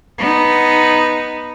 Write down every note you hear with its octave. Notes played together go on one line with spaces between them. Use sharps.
B3 D#4